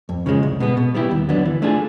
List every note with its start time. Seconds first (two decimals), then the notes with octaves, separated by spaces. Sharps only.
0.09 F2
0.26 C#3 F3 G#3
0.43 C2
0.60 B2 G#3 B3
0.77 B2
0.94 G3 B3 E4 G4
1.11 D#2
1.29 D3 F#3 B3 D4
1.46 E3
1.62 A3 D4 F4 G#4